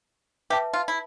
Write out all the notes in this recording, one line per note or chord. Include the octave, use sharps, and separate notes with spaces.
G4 B4 E5 A5
F4
E4